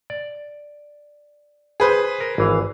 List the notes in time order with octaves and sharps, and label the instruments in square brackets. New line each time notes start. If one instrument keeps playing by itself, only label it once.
[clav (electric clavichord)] D5
[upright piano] G#4 B4 C5
[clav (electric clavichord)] A#4
G#1 E3 F5